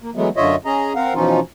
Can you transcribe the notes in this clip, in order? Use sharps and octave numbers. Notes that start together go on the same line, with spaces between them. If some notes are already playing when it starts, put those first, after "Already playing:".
A#3
E3 F#3 G#3 A3 B3
F#2 D3 F4 C#5 D#5 E5
C#4 G#4 D#5 A#5
C4 A#4 F5 F#5
B2 E3 F3 C#4 D#4 F4